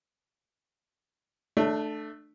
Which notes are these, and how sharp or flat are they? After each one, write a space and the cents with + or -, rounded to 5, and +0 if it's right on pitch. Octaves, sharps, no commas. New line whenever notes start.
A3 +0 D4 +30